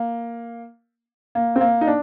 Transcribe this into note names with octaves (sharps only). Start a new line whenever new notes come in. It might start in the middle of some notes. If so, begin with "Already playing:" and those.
Already playing: A#3
A#3
C4
A#3
D#4
D4